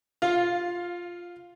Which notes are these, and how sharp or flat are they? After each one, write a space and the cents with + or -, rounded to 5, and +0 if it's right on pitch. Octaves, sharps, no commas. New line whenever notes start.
F4 +0 F5 +20